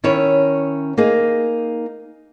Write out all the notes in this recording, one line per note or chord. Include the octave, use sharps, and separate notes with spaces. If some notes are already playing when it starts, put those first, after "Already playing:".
D#3 C#4 E4 C#5 E5
A#3 D#4 G#4